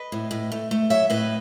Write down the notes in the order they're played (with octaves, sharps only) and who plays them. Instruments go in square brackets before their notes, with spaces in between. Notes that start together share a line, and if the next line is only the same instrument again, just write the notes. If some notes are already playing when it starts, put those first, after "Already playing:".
Already playing: [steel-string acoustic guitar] B4 D#5
A2
A2
A3
A3
F#3 C#5 E5
A2 B4 D#5